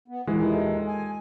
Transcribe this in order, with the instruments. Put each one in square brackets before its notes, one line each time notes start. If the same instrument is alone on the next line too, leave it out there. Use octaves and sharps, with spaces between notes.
[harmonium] B3
[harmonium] D#2 A#2 D#3 [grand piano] E3 [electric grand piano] G#3
[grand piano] A4
[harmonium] G#5